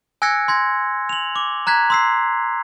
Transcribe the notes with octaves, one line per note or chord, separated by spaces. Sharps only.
G#5 E6 F#6 G#6 A#6 C#7
C6 G#6 A#6
F7 F#7
D6
A#5 F#6 G#6 B6
C6 E6 C7